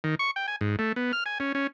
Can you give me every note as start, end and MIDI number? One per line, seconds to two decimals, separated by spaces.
0.04 0.15 51
0.19 0.31 85
0.36 0.46 79
0.48 0.56 80
0.61 0.76 44
0.79 0.92 57
0.96 1.12 59
1.13 1.24 89
1.26 1.38 80
1.40 1.52 61
1.55 1.67 61